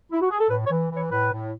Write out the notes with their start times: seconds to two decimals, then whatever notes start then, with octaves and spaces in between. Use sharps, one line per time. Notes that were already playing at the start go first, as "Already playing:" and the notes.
0.12 E4
0.21 F#4
0.31 G#4
0.40 A4
0.50 A2 B4
0.66 C#5
0.70 E3
0.91 E3
0.96 C#5
1.11 A2 B4
1.32 A2